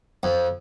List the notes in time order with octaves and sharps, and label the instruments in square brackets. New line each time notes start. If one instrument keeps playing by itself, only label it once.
[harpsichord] F2